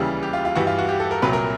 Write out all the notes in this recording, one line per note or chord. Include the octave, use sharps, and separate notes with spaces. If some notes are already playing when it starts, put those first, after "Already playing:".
Already playing: D#2 C#3 E3 G3
G4
F4
F4
G2 E3 G3 F#4
F4
F#4
G4
A4
A#4
C2 A#2 F#3 B4
A#4